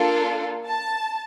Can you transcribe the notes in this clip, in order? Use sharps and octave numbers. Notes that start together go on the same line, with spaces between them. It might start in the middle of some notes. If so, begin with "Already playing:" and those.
Already playing: A#3 D4 F4 A4
A5